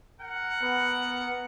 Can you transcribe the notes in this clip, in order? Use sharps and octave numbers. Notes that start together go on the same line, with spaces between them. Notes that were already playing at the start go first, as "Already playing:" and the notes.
A#4 F#5
B3